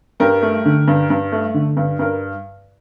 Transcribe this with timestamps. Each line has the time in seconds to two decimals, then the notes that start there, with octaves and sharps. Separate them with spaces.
0.20 G2 G4 A#4
0.42 A3
0.65 D3
0.88 G2
1.10 G2
1.32 A3
1.54 D3
1.77 G2
1.99 G2 A#4